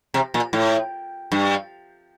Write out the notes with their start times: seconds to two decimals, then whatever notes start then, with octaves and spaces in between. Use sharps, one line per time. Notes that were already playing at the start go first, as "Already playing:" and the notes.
0.14 C3
0.34 A#2
0.53 A2
1.32 G2